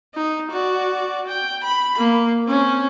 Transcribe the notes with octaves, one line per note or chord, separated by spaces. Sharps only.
D#4
F#4 D5
G5
B5
A#3
C4 C#4